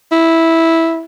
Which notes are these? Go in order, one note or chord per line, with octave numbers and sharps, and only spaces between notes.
E4